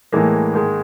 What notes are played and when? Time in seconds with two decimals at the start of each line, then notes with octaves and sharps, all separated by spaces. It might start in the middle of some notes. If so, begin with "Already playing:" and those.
0.12 A2 E3 G#3 A#3
0.54 G#2 D#3 G#3